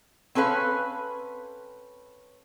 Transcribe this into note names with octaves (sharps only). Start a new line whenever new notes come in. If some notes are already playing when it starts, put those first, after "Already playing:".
C4 C#4 A4 B4 F5